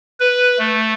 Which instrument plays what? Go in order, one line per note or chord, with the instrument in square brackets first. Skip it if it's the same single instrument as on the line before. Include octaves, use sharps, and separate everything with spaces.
[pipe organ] B4
A3